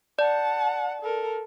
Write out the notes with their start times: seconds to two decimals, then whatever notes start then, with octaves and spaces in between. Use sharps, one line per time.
0.19 D5 F#5 A5
1.02 A4 A#4